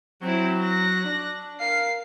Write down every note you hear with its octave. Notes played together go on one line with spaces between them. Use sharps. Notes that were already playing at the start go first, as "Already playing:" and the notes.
F#3 C4 E4
F#6 A#6
D4
A#4 F5 C7